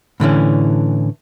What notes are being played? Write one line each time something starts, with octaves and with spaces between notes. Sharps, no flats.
A2 D3 E3 C#4